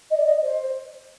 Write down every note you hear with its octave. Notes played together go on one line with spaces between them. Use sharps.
D#5
D5
D#5
C5